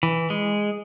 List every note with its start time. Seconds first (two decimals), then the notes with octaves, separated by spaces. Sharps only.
0.03 E3
0.30 G#3